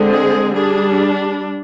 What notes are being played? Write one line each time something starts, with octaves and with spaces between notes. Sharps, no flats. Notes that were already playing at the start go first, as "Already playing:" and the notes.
Already playing: D3 G#3 C4
G#4
G3 D4 G#4